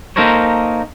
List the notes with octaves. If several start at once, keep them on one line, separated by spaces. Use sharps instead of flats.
A#3 D#4 A4 A#4 C5 C#5